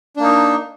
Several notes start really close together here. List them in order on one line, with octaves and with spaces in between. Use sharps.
D4 A#3 D#4